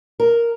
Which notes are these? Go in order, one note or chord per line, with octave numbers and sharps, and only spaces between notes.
A#4